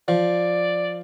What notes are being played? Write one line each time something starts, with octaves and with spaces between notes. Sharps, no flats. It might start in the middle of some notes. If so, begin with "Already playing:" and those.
F3 D5